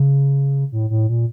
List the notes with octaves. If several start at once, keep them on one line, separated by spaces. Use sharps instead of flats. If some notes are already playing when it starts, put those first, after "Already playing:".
Already playing: C#3
A2
A2
A#2